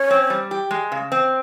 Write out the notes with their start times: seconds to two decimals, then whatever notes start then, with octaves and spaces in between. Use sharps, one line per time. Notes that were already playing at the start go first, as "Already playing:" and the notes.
Already playing: C#4 C#5
0.11 C4
0.30 G3
0.51 G4
0.71 G#3
0.92 C#3
1.12 C4